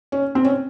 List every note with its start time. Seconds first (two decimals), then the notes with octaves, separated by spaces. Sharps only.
0.12 C#4
0.35 C4
0.45 C#4